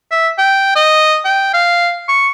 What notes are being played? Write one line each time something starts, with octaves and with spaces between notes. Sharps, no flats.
E5
G5
D#5
G5
F5
C#6